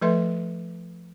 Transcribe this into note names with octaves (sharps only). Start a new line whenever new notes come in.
F3 A3 A4 B4 E5 C6